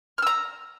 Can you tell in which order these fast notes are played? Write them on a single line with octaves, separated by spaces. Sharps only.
F6 E6 A#5